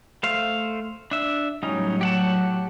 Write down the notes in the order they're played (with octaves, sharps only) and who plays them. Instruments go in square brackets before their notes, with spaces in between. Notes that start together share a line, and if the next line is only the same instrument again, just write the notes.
[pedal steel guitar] A3 C5 F5
D4 E5
[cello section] A2 F#3 [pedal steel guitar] G3 C#4 D#4
[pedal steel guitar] G4 F#5 A5